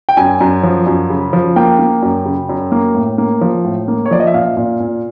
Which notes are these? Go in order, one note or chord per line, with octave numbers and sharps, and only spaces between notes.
G5
F#2 G#5
F#2
F3
F#2
C#3
F3
A#3 G5
A#3
F#2
C#3
F#2
A#3
A2
A#3
F3
A2
A#3
C#5
F3 D5
D#5
E5
A#2 F5
A#2
A#2